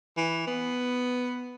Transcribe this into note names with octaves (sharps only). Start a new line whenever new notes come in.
E3
B3